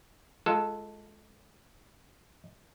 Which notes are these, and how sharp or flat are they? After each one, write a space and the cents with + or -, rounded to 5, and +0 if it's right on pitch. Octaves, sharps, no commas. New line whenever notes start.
G#3 +20 F4 +0 A4 +0